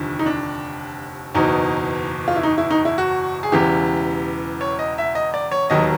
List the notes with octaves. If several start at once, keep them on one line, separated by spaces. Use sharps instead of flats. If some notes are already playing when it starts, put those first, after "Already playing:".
Already playing: F1 D#2 D3 F3
D#4
D4
F#1 E2 B2 D#4
F4
E4
D#4
E4
D#4
E4
F#4
G#4
E1 E2 C#3 E3 G4
C#5
D#5
E5
D#5
D5
C#5
E1 D#2 D#3 F#3 D#5